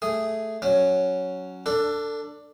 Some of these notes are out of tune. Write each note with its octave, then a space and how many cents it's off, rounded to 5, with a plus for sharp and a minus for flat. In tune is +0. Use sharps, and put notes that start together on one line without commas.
A3 +0 G#4 -5 D#6 +0
F#3 +0 C#4 +0
D4 +0 A4 +25